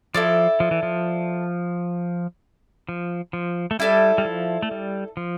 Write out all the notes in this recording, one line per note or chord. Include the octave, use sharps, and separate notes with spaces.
F3 E4 A4 D5
F3
E3
F3
F3
F3
A3
G3 E4 A4 D5
G3
F3
A3
G3
F3